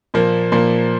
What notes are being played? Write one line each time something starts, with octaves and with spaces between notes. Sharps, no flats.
A#2 F3 A#3
A#2 F3 A#3